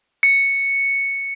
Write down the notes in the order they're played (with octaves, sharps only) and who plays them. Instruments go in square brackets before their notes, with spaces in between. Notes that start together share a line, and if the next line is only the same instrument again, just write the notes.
[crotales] C#7